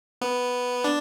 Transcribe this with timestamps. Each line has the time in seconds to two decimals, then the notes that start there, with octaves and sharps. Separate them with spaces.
0.21 B3
0.84 D4